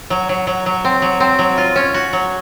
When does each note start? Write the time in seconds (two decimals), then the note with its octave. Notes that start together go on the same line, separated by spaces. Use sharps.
0.10 F#3
0.29 F#3
0.47 F#3
0.66 F#3
0.85 C4
1.02 F#3
1.20 C4
1.39 F#3
1.58 F4
1.76 C#4
1.94 F#4
2.13 F#3